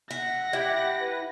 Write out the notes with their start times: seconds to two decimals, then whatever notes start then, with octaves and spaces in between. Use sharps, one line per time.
0.11 E5 F#5 A#6
0.53 E4 G4
1.01 B4